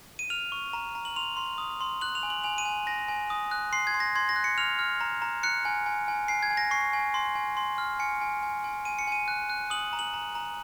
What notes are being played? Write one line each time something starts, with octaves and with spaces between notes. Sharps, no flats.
D#7
F6 F7
C#6
A#5
A#5
F#7
C6 F7
C6
D#6
C6
F#6 F#7
F7
G#5
F#7
G#5 F7
D#7
G#5
G#5 A#6
G#5
D#6
F#6
C6 C7
G#6
C6
A#6
C6 G#6
A#6
F#6
C#7
F6 F7
F6
A#5
A#5
F#6 C#7
G#5
G#5
G#5
G#5 C7
G#6
G#5
A#6
C#6 C7
G#5
C6
G#5
C6
F6
G#5 C#7
G#5
G#5
G#5
G#5 D#7
C#7
G#5 D#7
F#6
F#6
D#6 F#7
A#5
F#7
A#5
A#5